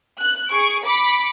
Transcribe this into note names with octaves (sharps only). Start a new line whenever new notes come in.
F#6
G#4 C#6 D7
B5 D6 C#7